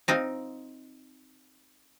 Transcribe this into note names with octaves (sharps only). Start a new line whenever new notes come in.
C4 D#4 F4